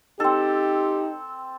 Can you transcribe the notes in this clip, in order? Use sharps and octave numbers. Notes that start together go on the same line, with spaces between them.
C4 D#4 G4 A4